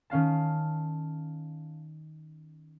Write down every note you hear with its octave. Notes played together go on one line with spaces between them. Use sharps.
D#3 C#4 F5 A5